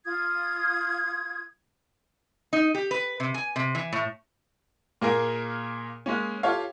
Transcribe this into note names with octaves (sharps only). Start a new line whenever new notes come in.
F4 D#6 G#6
D#4
G4
B4
C3
G#5
C3
E3
A2
A#2 A#3 G#4 A#4
G#3 A#3 C#4
F4 G4 A4 C#5 F5